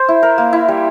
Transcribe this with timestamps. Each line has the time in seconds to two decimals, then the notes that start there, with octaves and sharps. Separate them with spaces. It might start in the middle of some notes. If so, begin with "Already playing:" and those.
Already playing: C5
0.09 E4
0.23 A#4
0.38 A#3
0.53 E4
0.68 G3